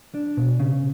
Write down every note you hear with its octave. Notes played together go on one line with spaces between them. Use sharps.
D4
B2
C#3